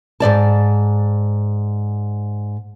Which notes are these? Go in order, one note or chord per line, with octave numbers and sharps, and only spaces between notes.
G#2 F3 D5 A5